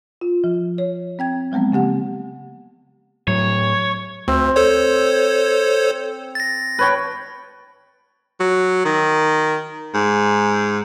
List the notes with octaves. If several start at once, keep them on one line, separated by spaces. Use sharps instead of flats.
F4
F3
C#5
C4 G5 G#6
F3 F#3 G#3 B3 C4
C#3 A#3 G4 F#5
A2 F#3 C#5
D2 C4
A4 C5 C#5
A6 A#6
B4 C#5 G5
F#3
D#3
G#2